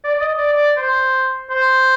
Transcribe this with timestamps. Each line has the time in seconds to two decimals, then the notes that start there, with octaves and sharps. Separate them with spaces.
0.04 D5
0.15 D5
0.21 D#5
0.37 D5
0.53 D5
0.77 C5
1.50 C5